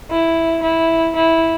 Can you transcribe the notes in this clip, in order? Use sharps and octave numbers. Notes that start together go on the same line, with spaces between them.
E4
E4
E4